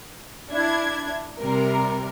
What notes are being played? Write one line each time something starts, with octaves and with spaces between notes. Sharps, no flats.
D4 E4 G#6
C3 G3 A#4